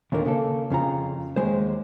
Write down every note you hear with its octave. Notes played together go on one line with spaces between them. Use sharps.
D#2 A#2 D3 A#3
C#3 A#3 A4
F2 C#3 F4 A#5
D#2 G#3 C5